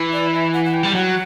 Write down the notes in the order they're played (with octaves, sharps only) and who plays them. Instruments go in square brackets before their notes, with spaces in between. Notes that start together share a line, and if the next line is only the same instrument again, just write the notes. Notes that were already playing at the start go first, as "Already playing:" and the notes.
Already playing: [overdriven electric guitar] E3
[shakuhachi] D5
E5
F#5
F#5
G5
[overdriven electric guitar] G3
[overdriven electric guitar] F#3 [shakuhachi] F#5